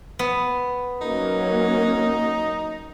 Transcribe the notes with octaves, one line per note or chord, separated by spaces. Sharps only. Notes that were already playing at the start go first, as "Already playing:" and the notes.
B3
F#3 A#3 C#4 D#4